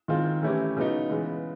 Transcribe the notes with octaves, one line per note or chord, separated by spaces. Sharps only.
D#3 G#3 C4 F4
E3 A3 C#4 E4 G4
C#3 F#3 B3 D#4
C#3 E3 G#3 B3